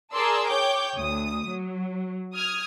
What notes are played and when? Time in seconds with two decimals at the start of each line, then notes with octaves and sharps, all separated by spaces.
0.12 G#4 A#4 D5 A5 C6 E6
0.48 C#5 G5 D6 G6
0.97 D2 D#6
1.49 F#3
2.35 D#6 F6 G#6